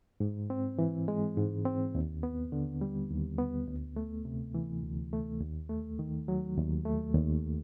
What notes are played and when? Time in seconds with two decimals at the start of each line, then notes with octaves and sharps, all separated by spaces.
0.20 G#2
0.50 C4
0.79 E3
1.08 G#3
1.37 G#2
1.65 C4
1.95 D#2
2.23 B3
2.52 D3
2.81 G3
3.10 D#2
3.38 B3
3.67 D2
3.96 A3
4.25 C3
4.54 E3
4.84 D2
5.13 A3
5.41 D#2
5.69 A3
5.99 D#3
6.28 F#3
6.57 D#2
6.85 A3
7.14 D#2